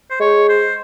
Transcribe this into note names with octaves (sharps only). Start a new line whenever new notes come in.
C5
G#3 C#5
C5